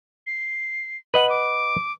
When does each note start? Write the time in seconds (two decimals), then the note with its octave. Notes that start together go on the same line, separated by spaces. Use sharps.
0.27 C7
1.14 B4 D#5 F#5 F#7
1.29 D6